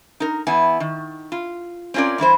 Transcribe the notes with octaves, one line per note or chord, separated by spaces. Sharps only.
D#4 A#4
E2 B3 E4 G#5
D#3
F4
C4 C#4 F4 A#4 D5
G2 E3 E4 C5